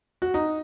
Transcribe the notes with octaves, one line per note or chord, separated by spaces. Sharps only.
F#4
D#4